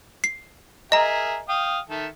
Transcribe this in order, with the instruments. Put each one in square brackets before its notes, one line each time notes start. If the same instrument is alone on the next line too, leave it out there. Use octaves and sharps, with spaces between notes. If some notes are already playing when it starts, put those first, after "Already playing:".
[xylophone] C7
[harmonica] G#4 A#4 E5 [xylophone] D#5 A#5
[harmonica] F5 G5 D#6
D#3 A4 E5